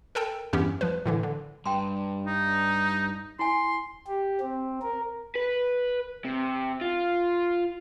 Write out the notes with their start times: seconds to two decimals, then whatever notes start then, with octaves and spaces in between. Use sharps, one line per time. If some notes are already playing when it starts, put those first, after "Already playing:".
0.15 A4 A#4 G5 A5
0.53 E2 G2 E3 B3 C#4 G4
0.81 F3 B4
1.06 A2 D3 E3
1.23 D3
1.66 G2 G5 A#5 C6
2.26 D#4
3.39 E4 G#5 C6
4.07 G4
4.41 C4
4.82 A#4
5.35 B4
6.25 C3
6.82 F4